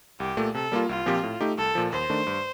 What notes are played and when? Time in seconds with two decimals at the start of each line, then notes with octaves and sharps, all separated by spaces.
0.20 C2 G4
0.37 A#2 A3
0.54 C3 A4
0.72 G3 A#3 F4
0.88 C2 F4
1.06 A#2 F3 C4 G4
1.23 A2
1.41 A3 D#4 G4
1.58 C2 A4
1.75 A#2 F3
1.92 D#2 C5
2.10 D#3 A3 D4
2.27 G2